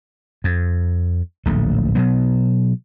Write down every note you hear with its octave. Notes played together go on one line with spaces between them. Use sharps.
F2
D1 A#1 A3
B2 F#3 B3